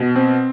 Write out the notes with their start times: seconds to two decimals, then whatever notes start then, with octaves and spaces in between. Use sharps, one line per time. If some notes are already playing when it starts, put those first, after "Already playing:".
Already playing: B2
0.16 C4